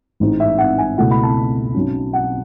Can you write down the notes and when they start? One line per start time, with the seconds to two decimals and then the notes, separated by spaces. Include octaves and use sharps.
0.20 A1 G#2 G#3
0.40 E5
0.58 F#5
0.78 G#5
0.98 C#2 B2 A3 E4 F#5
1.11 B5
1.23 A5
1.74 B1 B2 F#3 C#4
2.13 F#5